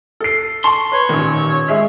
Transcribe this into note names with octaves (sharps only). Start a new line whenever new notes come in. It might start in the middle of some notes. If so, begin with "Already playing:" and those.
A4 C7
A5 C6 C#6 G7
B4 C#5
A1 A#2 D#3
G#3 E5